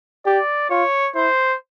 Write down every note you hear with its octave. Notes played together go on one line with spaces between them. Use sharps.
G4 D5
F4 C#5
E4 C5